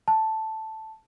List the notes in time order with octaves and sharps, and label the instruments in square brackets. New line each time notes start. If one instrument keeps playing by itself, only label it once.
[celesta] A5